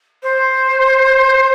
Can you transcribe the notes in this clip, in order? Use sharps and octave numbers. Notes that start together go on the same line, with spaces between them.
C5